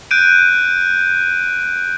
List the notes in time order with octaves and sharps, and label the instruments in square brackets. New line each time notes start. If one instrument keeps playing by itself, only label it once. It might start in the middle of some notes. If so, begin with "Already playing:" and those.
[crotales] F#6 G6 D7 D#7